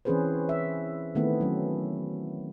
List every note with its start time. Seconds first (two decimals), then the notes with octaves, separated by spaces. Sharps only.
0.05 E3 C4 C#4 G#4 B4 C5
0.49 E5
1.15 D#3 A3 B3 C4 E4
1.41 F#3 C#4